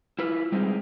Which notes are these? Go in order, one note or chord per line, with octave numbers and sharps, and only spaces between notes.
E4 F4 B4
G3 G#3 C4 D#4